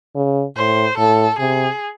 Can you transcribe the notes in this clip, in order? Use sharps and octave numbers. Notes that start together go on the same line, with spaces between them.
C#3
A2 C5
A2 A4
C3 G#4